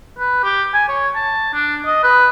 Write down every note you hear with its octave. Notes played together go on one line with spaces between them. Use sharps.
B4
G4
G#5
C#5
A5
D4
D#5
B4